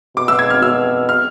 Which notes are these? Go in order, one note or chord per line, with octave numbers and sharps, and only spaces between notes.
B2 D6
E6
G#6
F6
B2 E6
F6